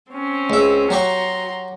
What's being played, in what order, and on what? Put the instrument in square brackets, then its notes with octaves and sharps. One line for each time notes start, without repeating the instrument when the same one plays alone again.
[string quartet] C4 C#4
[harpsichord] C#2 E5
[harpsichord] F#3 G4 C#6 [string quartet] F#4 A#5 C6